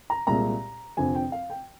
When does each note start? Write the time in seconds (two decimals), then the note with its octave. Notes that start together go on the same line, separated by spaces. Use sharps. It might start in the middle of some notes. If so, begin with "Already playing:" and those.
0.10 A#5
0.27 C2 A#2 G#3 A#5
0.97 F1 F2 D3 F3 C4 G#5
1.15 G5
1.32 F5
1.50 G5